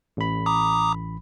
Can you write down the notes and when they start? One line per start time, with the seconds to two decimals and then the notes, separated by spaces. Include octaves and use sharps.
0.17 A1 B5
0.46 A#5 D6 D#6